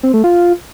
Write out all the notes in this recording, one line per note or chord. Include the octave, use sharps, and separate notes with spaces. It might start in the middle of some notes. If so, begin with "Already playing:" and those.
C4
A3
F4